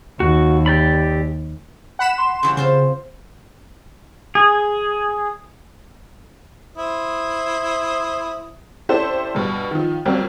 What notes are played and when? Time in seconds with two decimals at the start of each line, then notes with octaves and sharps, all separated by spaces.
0.20 D#2 F#4
0.66 G4 D5 B5
1.99 F#5 B5 E7
2.18 C6
2.43 C#3 E3 G3
2.57 C#3 C4 F4 C5
4.35 G#4
6.78 E4 C5 D#6
8.89 C#4 E4 G4 A4 C5 D5
9.35 G2 B2 G3
9.71 D#3 F3
10.05 F2 F#3 G3 A#3 C4 C#4